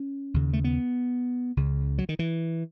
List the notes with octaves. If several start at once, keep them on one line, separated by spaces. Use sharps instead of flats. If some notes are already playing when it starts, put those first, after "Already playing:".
Already playing: C#4
D#2 C#3
A3
B3
C#2 C#3
F#3
D#3
E3